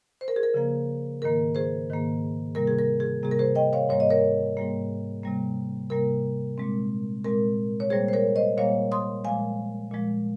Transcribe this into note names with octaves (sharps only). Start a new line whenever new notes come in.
C5
A#4
G#4
A#4
C#3 F3 A#3
G#2 D#3 A#3 A#4
G#4 C5
G#2 D#3 A#3
C3 G3 A#3 A#4
G#4
A#4
G#4
C3 G3 A#3 G#4
A#4
G#4 C5
D#5 G5
C#5 F5
G#2 G3 A#3 C#5
D#5
A#4 C#5
G#2 G3 A#3
C3 G3 A#3
C3 G3 A#3 A#4
A#2 G#3 C4
A#2 G#3 C4 A#4
C#5
A#2 G3 A#3 G#4 C5
C5
A#4 C#5
C5 D#5
A#2 G3 A#3 C#5 F5
C6 D#6
A#2 F3 G#3 F5 G#5
A#2 F3 G#3